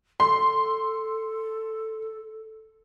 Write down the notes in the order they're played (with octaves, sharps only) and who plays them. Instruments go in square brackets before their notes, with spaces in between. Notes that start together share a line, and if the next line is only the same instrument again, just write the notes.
[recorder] A4 [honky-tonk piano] C6